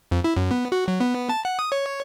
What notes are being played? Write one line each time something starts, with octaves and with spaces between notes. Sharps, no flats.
F2
E4
F#2
B3
F#4
F#3
B3
A5
F#5
D#6
C#5